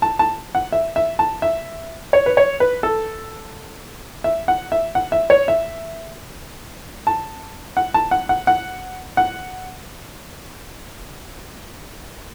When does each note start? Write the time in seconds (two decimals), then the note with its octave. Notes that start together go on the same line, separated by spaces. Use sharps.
0.02 A5
0.19 A5
0.55 F#5
0.72 E5
0.96 E5
1.19 A5
1.42 E5
2.13 C#5
2.26 B4
2.37 C#5
2.60 B4
2.83 A4
4.24 E5
4.48 F#5
4.72 E5
4.95 F#5
5.12 E5
5.30 C#5
5.48 E5
7.07 A5
7.77 F#5
7.94 A5
8.11 F#5
8.29 F#5
8.47 F#5
9.17 F#5